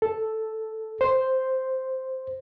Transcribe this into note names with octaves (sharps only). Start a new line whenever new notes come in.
A4
C5